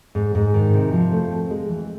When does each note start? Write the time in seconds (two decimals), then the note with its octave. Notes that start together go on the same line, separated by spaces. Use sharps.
0.15 G#2
0.35 G#2
0.54 D#3
0.74 C3
0.93 F3
1.12 A3
1.32 C4
1.50 G#3
1.69 E3